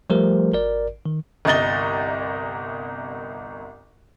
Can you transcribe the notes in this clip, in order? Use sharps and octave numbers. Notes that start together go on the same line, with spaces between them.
F3 G3 A3 G4 A#4 C5
G#1 A#4 D5
D#3
G1 C2 D#5 A6 G7